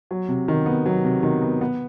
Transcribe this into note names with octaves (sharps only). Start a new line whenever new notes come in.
F#3
C3
D#3
B3
F#3
C3
D#3
B3
B3